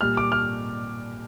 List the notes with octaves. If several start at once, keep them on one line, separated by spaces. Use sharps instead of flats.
A#2 G3 F6
D6
F6